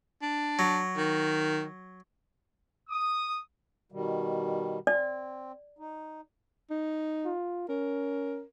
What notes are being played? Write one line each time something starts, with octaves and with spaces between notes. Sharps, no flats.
D4
F#3
D#3
D#6
B2 D#3 G3
C4 D5
D#4
D#4
F4
C#4 A#4